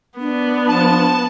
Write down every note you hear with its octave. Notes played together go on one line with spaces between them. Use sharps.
B3 D4
F3 A5